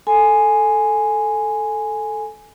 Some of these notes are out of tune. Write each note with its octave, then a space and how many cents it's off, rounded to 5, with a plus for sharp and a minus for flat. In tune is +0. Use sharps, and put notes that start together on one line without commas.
A4 +0 G#5 +0 C6 -35